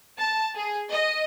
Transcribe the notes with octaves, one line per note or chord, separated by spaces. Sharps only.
A5
G#4
D#5